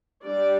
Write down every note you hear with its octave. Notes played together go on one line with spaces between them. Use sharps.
G3 D4 D5